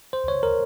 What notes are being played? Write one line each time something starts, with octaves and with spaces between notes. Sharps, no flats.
C5
C#5
A#4